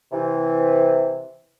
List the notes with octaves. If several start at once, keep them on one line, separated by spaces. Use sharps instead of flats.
C3 E3